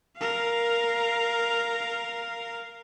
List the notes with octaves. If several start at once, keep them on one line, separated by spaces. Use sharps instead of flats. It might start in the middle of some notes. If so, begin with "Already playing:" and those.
A#4 F5